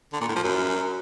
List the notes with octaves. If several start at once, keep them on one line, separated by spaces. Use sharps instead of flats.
D3
A#2
A2
F3
F#2